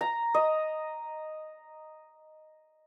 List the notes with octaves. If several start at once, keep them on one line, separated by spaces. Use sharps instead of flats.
A#5
D#5